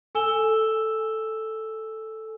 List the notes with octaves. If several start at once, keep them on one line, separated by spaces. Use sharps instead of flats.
A4 G#5 E6 E7 G7